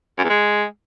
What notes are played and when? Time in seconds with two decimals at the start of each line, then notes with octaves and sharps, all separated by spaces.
0.18 F#2
0.24 E2
0.30 G#3